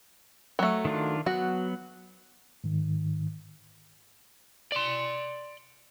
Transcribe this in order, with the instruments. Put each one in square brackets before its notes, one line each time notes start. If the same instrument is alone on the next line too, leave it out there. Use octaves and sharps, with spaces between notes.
[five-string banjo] F#3 A3
[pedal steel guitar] D#3 D4 F4
[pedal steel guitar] F#3 B3 [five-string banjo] F#4
[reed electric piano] G#2 D#3
[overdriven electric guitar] D5 C6